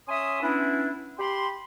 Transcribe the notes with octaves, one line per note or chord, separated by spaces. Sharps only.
C#4 E5 G#5 C6 D#6
B3 C#4 D4 E4
G4 B5 C6